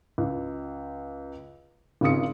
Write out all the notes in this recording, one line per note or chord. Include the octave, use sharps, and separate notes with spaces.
C#2
G#1 C#3 F4 G#4 D#6 C#7